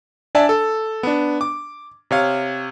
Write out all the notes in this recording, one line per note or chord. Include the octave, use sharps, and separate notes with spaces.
D4 D5 E5 G#5 A5
A4
B3 D4
D6
C3 C#5 F5